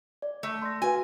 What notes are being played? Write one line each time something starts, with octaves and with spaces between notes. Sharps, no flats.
D5
A3
C6 A#6
F#4 B4 F5 G#5